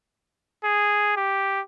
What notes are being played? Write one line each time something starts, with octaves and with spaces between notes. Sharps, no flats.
G#4
G4